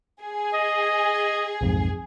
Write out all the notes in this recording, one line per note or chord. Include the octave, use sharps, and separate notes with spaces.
G#4
D#5
B1 F2 G#2